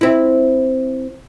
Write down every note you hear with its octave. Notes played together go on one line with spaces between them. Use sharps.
C4 E4